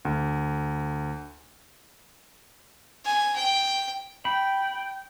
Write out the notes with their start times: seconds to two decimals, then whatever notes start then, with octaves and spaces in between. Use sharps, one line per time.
0.05 D2
3.05 G#5
3.36 G5
4.25 G5 B5